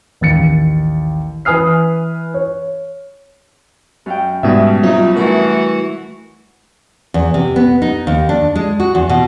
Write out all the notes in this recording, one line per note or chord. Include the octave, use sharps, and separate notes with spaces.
A1 D#2 A6 C#7
E3 B4 G#5 D#6 F6 C7
C#5
F#2 F5 G5
G#2 B2 G3 C#4 D#4 E5 D#6
F#3 C4 D#4 F4
E3 A3 F#4 A#4 C#6
E2
C3
B3
D#4
D#2
D4
G#3
F#4
E2
B2